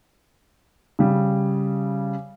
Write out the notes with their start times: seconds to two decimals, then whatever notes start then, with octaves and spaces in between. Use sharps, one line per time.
0.99 C#3 G3